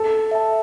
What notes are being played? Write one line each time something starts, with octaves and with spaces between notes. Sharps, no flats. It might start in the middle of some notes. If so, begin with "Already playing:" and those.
Already playing: A4
E5 A5